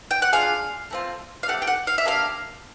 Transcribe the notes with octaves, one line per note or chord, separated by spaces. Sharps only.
G5
F#5
D4 F4 G#4 F5
A3 C4 F4
F5
A3 C4 G4 F#5
G5
F#5
F5
E5
A#3 D4 G4 F5